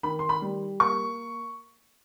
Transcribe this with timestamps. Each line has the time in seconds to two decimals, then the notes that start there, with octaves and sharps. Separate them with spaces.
0.03 D#3 B5
0.19 C6
0.29 B5
0.42 G3
0.80 A#3 C#6